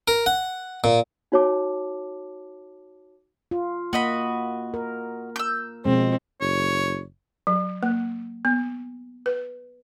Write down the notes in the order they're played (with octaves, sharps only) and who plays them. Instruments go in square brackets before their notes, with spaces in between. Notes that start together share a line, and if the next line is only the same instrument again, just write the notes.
[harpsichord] A#4
F#5
A#2
[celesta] D#4 F#4 C#5 A5 D6
[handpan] F4
[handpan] A#3 [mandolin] F#4 D#5 B5
[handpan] A#4
[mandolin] E6 G6
[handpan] B2 F3 G#3 [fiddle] C4
[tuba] F#1 [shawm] C#5
[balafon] F#3
A#3
B3
B4